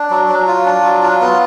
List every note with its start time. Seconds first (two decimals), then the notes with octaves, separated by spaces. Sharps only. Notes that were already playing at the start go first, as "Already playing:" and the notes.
Already playing: D4
0.10 F#3
0.28 F#3
0.47 F4
0.65 D4
0.83 F#3
1.02 F4
1.21 B3